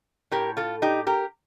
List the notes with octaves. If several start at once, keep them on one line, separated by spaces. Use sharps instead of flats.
A2 G4 A#4
F4 A4
D#4 G4
G4 A#4